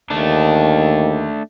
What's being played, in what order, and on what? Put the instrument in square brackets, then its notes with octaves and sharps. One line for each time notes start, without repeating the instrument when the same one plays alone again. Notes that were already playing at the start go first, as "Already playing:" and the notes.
[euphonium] D#2 [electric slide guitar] A3 D4